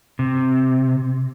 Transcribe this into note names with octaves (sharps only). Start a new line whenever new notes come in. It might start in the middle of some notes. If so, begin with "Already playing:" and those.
C3